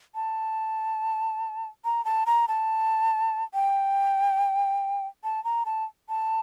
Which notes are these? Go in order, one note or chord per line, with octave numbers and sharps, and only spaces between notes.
A5
A#5
A5
A#5
A5
G5
A5
A#5
A5
A5